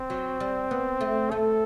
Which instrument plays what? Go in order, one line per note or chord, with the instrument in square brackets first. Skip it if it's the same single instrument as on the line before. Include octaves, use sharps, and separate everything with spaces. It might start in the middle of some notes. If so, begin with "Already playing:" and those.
Already playing: [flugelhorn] C4
[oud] F#3
G3
B3
A3
[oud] A3 [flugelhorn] A4